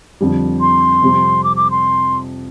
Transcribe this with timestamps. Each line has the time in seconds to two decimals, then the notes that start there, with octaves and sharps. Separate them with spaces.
0.21 F2 D3 G3
0.61 C6
1.02 F2 C3 G3
1.44 D6
1.57 D6
1.71 C6